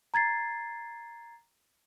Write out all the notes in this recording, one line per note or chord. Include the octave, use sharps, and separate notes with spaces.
A#5 G#6 A6 C7